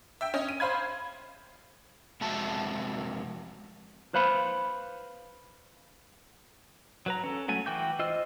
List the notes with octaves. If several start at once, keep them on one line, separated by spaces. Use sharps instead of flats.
E5 G5
C#4 D#5
D#7
C5 F5 B5 G#6
F2 C3 G#3 F#4 E5 A5
B4 C5 F5 B5
F#3 B4 A#5
C#4 A4
F#3 A3 G#5
E3 F#4 G5 D6 G6
F4 C5 D#5 E6 F6